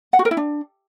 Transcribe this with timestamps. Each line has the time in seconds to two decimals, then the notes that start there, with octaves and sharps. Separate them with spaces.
0.13 F#5
0.19 F#4
0.25 A#4
0.31 E4
0.37 D4